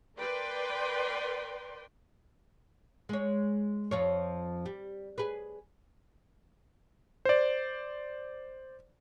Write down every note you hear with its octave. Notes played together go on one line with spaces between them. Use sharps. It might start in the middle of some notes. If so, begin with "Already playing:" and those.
A#4 B4 D5 G5 C6
G#3 C#5
F2 F3 C#5
G3
G#4 B4
C5 D5